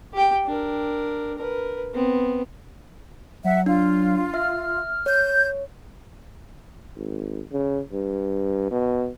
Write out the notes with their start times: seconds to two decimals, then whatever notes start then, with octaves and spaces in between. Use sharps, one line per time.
0.13 G4 G5
0.46 D4 A#4
1.38 A#4 B4
1.94 B3 C4
3.44 F#3 E5 F#5
3.66 D4 F4
4.34 E5 F6
5.06 C#5 G6
6.97 G#1
7.52 C#3
7.92 G2
8.71 B2